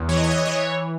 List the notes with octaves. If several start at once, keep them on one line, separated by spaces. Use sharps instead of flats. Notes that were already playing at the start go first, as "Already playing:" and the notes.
Already playing: E2
E3 C#5
D#5
C#5
D#5
C#5
E3 D#5
C#5